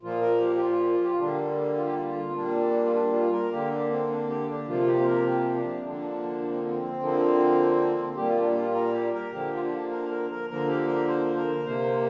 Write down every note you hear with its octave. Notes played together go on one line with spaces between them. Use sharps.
A#2 F3 A#3 F4
A#4
G4
G4
F4
G4
F4
D3 G3 A#3 D4
F4
G4
F4
F4
C4
A#2 G3 A#3 D4
F4
D4
F4
A#4
D3 A#3 G4
D4
C4
D4
G4
D4
C3 F3 A#3 F4
G4
C5
A#4
G4
D4
D3 F3 A#3 D4
D4
C4
C4
D3 F3 A#3
A#2 G3 A#3 G4
F4
D4
F4
A#4
G4
A#4
D3 F3 A#3 G4
F4
D4
A#4
A#4
A#4
D3 F3 A#3 A#4
G4
A#4
C5
A#4
C3 A#3 C5